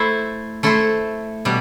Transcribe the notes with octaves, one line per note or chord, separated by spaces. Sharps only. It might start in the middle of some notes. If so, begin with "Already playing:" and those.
Already playing: A3 E4 A4 C5
A3 E4 A4 C5
B2 G3